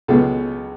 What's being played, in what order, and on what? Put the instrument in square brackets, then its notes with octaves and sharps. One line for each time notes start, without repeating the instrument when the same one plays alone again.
[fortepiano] C#2 B2 G#3 B3 A4